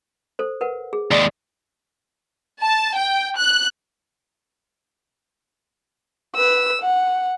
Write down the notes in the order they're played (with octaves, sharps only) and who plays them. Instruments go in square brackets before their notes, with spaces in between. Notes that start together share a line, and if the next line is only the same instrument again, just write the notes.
[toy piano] A4 C5
A#4 B4 F#5
G#4
[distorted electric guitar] D#2 G#3 [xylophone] D5
[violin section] A5
G5
F#6
[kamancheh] B4 E6
F#5